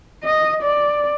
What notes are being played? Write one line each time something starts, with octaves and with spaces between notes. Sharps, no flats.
D#5
D5